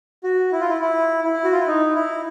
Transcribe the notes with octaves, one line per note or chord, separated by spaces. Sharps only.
F#4
E4
F4
E4
E4
E4
F#4
F4
E4
D#4
E4